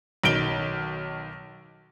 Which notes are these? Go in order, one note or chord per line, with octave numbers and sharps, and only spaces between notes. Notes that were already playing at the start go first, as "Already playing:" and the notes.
B1 D#3 D7 G7